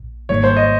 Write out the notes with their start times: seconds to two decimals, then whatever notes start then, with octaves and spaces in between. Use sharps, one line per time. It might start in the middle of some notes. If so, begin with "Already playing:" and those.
Already playing: A#1 A#2
0.29 G#1 G#2 D#3 G3 A#3 C#5
0.44 C5
0.57 D#5